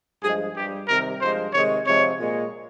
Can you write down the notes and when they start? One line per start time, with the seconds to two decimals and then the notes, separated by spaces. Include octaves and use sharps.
0.22 G2 F3 G#3 G#4
0.55 G2 G3 G4
0.88 C3 D#3 G3 A#4
1.20 G2 F3 G#3 C5
1.53 C3 D#3 G#3 C#5
1.85 C3 F3 G#3 C#5
2.19 A#2 G#3